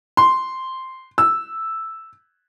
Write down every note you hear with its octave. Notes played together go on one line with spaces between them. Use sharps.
C6
E6